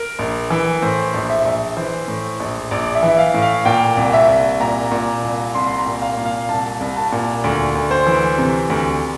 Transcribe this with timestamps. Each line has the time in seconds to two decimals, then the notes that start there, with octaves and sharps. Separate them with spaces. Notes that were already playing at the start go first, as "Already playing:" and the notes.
Already playing: A#4
0.19 A#1
0.50 E3
0.82 A2 C5
1.14 A#1
1.30 E5
1.45 A#1
1.77 E3 C5
2.08 A2
2.40 A#1
2.71 A#1 D5
2.95 E5
3.03 E3
3.08 E5
3.18 F5
3.34 A2
3.42 F5
3.65 A#2 G5
3.97 C2
4.13 E5
4.29 C2
4.60 A#2 A#5
4.92 A#2
5.23 C2
5.55 C2 C6
5.67 C6
5.78 A#5
5.86 A#2
6.02 F5
6.17 A#2
6.25 F5
6.49 C2 A5
6.80 C2
6.96 A5
7.12 A#2
7.44 D2
7.75 D2
7.91 C5
8.06 E3
8.38 C3
8.70 D2